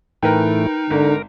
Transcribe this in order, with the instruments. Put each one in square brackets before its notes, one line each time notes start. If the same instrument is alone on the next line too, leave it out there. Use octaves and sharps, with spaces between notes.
[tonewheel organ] A2 E3 A3 [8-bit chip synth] D#4 [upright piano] A#4 B4 G5
[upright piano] G#1 [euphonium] D3 [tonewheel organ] A#4